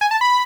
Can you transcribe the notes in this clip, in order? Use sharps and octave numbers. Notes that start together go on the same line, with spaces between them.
G#5
A5
B5